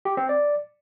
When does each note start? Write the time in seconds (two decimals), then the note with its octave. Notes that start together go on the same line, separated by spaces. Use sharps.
0.05 G4
0.17 C4
0.29 D5